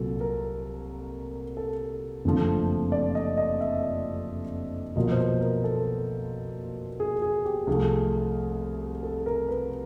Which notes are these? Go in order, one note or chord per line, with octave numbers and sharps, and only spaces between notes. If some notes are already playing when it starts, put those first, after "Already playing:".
Already playing: C2 A#2 F#3 A4
A#4
A4
F#1 F2 D3 F3 A3
D5
D#5
D#5
E5
B1 A#2 F3 D#5
C5
B4
A#4
A4
G#4
G#4
G4
C2 C3 F3 A3 G#4
A4
A#4
B4